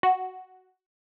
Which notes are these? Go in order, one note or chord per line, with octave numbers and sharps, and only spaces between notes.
F#4